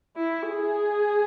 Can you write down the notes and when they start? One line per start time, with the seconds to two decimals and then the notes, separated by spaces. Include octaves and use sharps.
0.16 E4
0.49 G#4